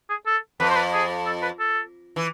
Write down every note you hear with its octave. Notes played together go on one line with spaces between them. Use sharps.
G#4
A4
F2 B4
C5
B4
G#4
A4
B4
A4
E3